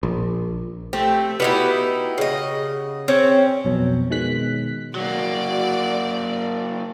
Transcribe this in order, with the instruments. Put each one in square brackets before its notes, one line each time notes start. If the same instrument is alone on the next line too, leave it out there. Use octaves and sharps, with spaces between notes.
[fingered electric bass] A#1
[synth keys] A3 G4 [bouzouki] C4
[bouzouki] B3 D#4 E4 [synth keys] F#4 G4
[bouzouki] C#3 D#5
[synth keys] C4 [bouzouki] C#4
[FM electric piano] B1 F2 B2
B2 D#3 G#3 F#6 B6
[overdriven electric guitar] F#3 A#3 [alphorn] F#4 [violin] D5